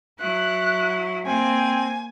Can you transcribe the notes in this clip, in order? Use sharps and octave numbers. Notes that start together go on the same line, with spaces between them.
F#3 E4 F#6
A#3 C4 G#5